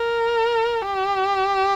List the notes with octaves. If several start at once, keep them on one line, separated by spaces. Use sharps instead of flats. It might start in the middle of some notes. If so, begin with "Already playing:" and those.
Already playing: A#4
G4